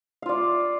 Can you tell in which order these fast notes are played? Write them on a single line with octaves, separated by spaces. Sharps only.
F5 F4 D5